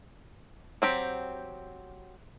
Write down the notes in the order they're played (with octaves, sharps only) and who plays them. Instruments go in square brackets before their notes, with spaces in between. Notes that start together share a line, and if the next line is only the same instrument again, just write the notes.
[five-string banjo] F#3 C4 G4